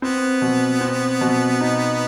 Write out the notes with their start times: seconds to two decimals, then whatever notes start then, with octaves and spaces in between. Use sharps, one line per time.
0.02 B3 C4
0.42 B2
0.81 C4
1.21 B2
1.60 D#4